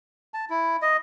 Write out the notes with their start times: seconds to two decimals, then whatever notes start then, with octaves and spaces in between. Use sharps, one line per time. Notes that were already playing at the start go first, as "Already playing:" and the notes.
0.34 A5
0.50 E4
0.82 D#5